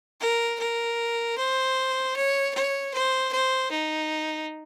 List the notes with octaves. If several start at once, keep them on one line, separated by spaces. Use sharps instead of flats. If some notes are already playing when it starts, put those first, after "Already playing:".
A#4
A#4
C5
C#5
C#5
C5
C5
D#4